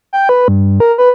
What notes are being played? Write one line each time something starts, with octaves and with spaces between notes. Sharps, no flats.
G5
B4
G2
A#4
B4